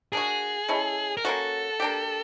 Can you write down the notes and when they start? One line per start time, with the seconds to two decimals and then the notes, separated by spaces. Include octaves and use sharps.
0.13 A#3 D4 F#4 G#4
0.68 G#3 C#4 E4 A4
1.17 A#4
1.24 A#3 C#4 F#4 A4
1.80 A#3 D4 G4